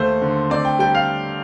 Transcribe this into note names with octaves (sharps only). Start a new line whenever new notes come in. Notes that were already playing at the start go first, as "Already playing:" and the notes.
Already playing: D#2 A3 C5
D3
C4 D5
G5
G3 G5
F5